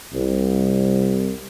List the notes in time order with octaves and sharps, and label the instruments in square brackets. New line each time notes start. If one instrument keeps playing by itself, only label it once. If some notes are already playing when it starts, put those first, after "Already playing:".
[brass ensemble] C2